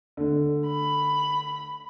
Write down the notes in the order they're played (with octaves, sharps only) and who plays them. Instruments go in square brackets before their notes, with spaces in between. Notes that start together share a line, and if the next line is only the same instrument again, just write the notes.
[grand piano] D3 A3
[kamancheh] B5